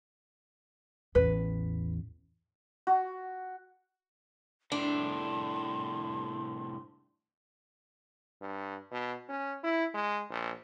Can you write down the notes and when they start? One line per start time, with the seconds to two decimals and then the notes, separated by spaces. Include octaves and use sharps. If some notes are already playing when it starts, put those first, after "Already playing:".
1.15 A1 E2 B4
2.87 F#4
4.72 C2 A2 D4 C6
8.41 G2
8.91 B2
9.29 C#4
9.63 E4
9.94 G#3
10.30 A#1